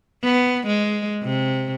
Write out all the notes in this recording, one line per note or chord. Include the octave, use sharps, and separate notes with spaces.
B3
G#3
C3